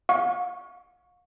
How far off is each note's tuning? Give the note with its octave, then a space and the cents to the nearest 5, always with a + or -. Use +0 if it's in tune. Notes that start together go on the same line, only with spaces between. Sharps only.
F5 +40 C#6 +0